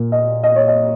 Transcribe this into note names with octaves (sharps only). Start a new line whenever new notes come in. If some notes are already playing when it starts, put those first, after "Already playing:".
Already playing: A#2 A#3
D#5
D#5
C#5
D#5